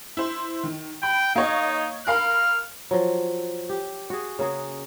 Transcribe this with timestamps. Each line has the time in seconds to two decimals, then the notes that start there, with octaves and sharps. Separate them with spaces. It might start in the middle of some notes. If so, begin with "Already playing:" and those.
0.17 E4 C5
0.63 D#3
1.03 G5 B5
1.35 A#3 D#4 C#5 D#5
2.07 A#4 F5 B5 F6
2.91 F3 F#3
3.69 G4
4.10 F#4 G#4
4.39 C#3 A#3 F#4 G#4